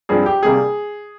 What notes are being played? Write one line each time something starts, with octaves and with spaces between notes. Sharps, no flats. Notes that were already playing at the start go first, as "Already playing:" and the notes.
G2 F3 C4 G#4
G4
C3 D#3 G3 A#3 G#4